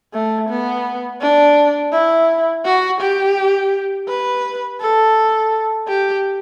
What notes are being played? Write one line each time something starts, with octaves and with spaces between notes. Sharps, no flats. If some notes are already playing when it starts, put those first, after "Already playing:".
A3
B3
D4
E4
F#4
G4
B4
A4
G4